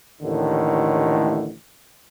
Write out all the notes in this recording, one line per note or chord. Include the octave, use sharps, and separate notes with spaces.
A1 D#2 A2 D3 D#3